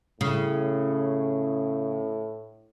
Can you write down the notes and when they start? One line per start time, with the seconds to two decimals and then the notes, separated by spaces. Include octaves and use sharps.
0.21 A2 C#3